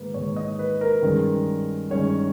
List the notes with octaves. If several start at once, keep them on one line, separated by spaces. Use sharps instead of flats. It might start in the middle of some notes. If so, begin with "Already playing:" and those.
Already playing: G#2 D#3 A#3 B4
G#2 D#3 A#3 C#5
D#5
B4
A#4
G2 D#3 G#3 C#4
G2 D#3 G#3 C#4 C#5